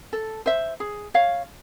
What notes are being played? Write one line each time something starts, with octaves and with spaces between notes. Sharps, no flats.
A4
C5 E5
G#4
C#5 F5